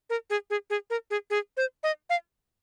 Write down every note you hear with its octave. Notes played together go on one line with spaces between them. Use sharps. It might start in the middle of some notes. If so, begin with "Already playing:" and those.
A#4
G#4
G#4
G#4
A#4
G#4
G#4
C5
D#5
F5